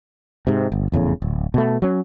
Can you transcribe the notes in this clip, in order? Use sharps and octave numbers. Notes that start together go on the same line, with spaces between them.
G#2 C3
G1
F1 E2 A2 C#3
D1
B2 A3
F#3 C#4